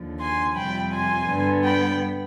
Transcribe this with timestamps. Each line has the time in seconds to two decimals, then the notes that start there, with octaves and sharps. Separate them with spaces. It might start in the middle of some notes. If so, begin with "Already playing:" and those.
Already playing: D#2 D3 F3
0.21 G#5 C6
0.56 F2 C3 G3 G5 B5
0.92 G#5 C6
1.28 G2 D3 G3 B3
1.63 G5 B5